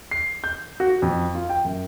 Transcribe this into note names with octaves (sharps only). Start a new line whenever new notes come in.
C7
G6
F#4
F2
F4
G5
F#2